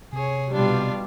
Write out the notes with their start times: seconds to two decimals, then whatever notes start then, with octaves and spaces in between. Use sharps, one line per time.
0.13 C3 G#4 C#5
0.53 B2 G3 D4 F4